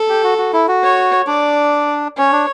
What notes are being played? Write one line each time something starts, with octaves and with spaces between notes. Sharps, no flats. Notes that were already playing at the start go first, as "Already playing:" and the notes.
Already playing: A4
G4
F#4
F#4
E4
F#4
C#5
D4 D5
C#4 C#5
D4